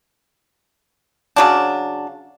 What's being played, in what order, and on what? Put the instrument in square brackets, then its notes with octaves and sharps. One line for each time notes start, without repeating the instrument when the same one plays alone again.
[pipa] C#3 F#3 D4